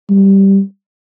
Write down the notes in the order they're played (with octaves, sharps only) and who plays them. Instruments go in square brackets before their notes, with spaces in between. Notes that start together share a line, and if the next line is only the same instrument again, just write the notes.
[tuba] G3